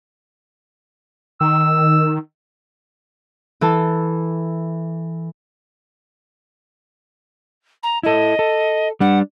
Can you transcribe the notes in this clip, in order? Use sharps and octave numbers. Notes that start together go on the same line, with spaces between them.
D#3 E6
E3 A4 A5
A#5
E4 A4 D#5
A4
G3 D4 F#5